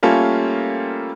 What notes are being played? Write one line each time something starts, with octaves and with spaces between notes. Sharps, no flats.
G3 A3 A#3 C#4 F4 A4